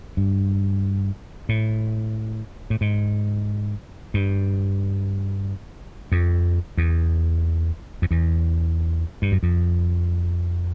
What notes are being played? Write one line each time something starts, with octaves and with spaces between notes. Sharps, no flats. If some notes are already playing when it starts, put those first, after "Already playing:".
G2
A2
A2
G#2
G2
F2
E2
F2
E2
G2
F#2
F2